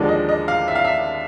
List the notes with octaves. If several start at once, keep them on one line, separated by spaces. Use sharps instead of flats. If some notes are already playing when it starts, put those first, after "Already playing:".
Already playing: D#2 D3 F3 G#3 D5
D#5
D#5
F5
E5
F5
E5